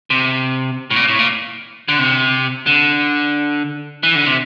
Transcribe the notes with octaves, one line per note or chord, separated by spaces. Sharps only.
C3
A2
A#2
A2
A#2
D3
C3
D3
E3
D3
C3